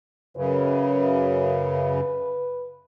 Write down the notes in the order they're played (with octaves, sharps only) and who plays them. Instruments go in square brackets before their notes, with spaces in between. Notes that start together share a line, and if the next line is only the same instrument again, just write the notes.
[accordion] F#2 C#3 [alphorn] B4